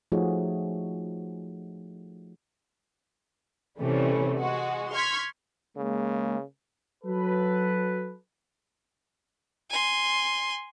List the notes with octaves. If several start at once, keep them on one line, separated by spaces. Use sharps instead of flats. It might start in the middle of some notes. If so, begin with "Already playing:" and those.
F3 A3 D#4 F#4 G#4 C#5
C3 E3 G3 A3 C#4
G#3 F#4
C6 C#6 F6 G#6 B6
C#3 G#3 A#3
F#3 A4 B4
G#5 C6